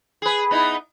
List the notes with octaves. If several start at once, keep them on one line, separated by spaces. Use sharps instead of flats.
G#4 B4
B3 D#4 E4